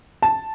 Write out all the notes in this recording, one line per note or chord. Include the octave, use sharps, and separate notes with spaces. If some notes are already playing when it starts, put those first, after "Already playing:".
A5